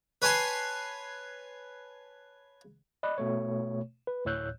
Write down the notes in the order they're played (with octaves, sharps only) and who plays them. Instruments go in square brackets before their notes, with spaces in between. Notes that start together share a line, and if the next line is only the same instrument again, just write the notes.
[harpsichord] B4 C#5 G#5 A5 C6
[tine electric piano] D5 D#5 B5 F#6
B2 A3 C#5
B4
D2 A2 C#5 E6 F#6 G6